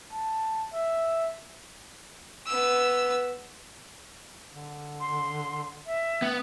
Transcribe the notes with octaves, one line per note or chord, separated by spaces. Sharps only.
A5
E5
B3 E6
D3
C6
E5
B3